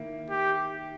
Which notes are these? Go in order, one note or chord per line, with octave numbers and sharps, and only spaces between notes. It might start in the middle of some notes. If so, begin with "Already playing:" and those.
Already playing: D#3 A#3 E4
G4